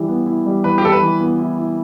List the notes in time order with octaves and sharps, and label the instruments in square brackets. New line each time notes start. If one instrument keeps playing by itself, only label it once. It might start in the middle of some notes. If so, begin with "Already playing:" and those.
Already playing: [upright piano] E3 G3 E4
B3
E4
G3
[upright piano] E3 [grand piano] B4
[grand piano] G4
[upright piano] E3 [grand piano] A4
[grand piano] B4
[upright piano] E3
B3
E4
E4